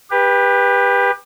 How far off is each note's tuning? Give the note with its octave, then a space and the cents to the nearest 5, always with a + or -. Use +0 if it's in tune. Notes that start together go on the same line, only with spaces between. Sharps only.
G4 +25 B4 -10